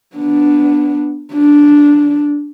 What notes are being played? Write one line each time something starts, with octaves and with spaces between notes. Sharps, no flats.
B3 D4
D4